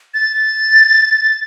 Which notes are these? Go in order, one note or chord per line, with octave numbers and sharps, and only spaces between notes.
A6